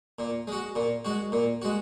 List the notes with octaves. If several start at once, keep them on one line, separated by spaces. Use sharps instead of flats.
A#2
G#3 F#4
A#2
G#3 F#4
A#2
G#3 F#4